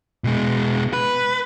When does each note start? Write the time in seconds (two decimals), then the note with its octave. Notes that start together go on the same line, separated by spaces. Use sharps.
0.24 B2 G#3
0.93 B4